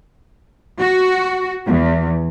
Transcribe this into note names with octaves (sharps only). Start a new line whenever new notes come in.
F#4
E2